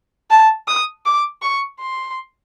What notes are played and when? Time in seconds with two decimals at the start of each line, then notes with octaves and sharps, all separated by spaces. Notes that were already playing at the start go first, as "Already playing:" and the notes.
0.30 A5
0.68 D#6
1.06 D6
1.42 C#6
1.80 C6